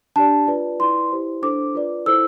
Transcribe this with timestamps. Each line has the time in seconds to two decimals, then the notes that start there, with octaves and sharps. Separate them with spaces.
0.16 D4 G4 D5 A5
0.47 F4 B4 D5
0.79 E4 B4 D5 C6
1.11 E4 G4 C5
1.42 D4 A4 C5 D6
1.75 F4 B4 D5
2.06 E4 A4 C5 E6